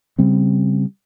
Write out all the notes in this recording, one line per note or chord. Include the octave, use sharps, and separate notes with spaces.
C#3 G3 C4